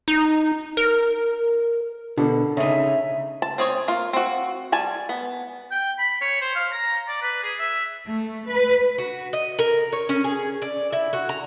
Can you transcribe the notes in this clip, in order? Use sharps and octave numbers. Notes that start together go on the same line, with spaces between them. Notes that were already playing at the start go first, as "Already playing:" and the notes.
D#4
A#4
B2 D3
C#3 D#4 E5
A5
C4 G#4 C#5
A#3 F4
C4 F#4
G3 G#5 A5
B3
G5
B5
C#5
C5
F5
A#5
D5
B4
G#4
E5
A3
B4
F#4
D#5
A#4
C#5
C#4
G#4
D5
E4
F#4
A#5